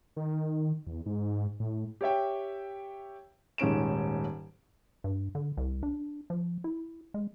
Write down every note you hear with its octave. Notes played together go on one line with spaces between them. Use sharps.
D#3
E2
G#2
A2
G4 C#5 E5 G5
D#1 G#2 C#4 D7 E7
G2
D3
C2
D4
F3
E4
G#3